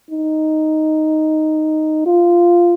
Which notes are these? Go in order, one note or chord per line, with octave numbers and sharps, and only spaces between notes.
D#4
F4